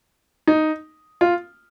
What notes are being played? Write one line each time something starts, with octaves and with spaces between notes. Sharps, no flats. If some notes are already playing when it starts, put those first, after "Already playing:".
D#4
F4